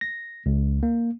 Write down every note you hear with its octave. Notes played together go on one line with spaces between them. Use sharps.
A#6
C#2
A#3